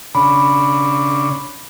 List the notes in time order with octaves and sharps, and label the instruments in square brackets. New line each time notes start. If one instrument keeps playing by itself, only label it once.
[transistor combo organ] C#3 D4 [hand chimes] B5